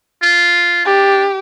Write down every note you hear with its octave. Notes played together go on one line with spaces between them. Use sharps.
F4
D4 G4